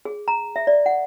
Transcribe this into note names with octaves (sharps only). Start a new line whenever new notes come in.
G#4
A#5
E5
D5
F#5